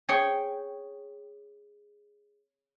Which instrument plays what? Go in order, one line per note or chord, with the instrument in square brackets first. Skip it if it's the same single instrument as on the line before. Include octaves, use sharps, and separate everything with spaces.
[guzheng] G#4 C#5 G5